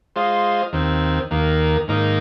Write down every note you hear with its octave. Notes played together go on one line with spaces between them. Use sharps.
G#3 F4 C5 D#5
D#2 D#3 C4
D#2 D#3 A#3
G#2 D#3 A#3 D#4